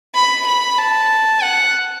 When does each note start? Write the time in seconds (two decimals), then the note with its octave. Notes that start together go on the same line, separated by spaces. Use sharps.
0.14 B5
0.46 B5
0.78 A5
1.43 F#5